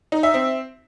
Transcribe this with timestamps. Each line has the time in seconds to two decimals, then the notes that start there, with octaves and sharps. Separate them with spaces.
0.12 D#4
0.23 E5
0.34 C4